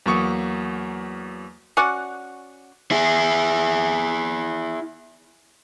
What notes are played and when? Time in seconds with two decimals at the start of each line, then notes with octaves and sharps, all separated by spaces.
0.06 E2 F#3 A#3 C#6 D#6 C#7
1.77 C#4 F#4 D5 F#5
2.91 E4 G#4